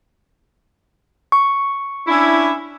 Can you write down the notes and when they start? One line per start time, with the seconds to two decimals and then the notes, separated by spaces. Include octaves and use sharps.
1.32 C#6
2.08 C#4 D4 E4